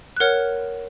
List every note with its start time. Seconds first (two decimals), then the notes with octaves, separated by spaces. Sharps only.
0.17 F#6
0.20 A#4 C#5 F#5 F6